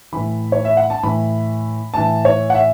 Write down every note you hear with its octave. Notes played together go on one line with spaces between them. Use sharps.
A2 E3 B5
C#5
E5
F#5
A5
A2 E3 B5
A2 E3 A5
C#5
F#5
E5